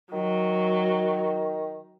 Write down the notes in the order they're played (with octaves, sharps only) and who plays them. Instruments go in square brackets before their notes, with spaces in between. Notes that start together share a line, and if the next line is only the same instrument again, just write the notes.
[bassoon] D#3 [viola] F#3